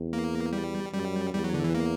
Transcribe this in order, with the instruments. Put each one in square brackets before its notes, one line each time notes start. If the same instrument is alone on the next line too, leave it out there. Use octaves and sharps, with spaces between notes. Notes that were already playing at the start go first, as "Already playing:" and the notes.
Already playing: [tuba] E2
[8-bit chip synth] A#3
G3
[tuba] F#2 [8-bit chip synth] G3
[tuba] E2 [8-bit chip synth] G3
[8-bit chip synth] F#3
D3
E3
A#3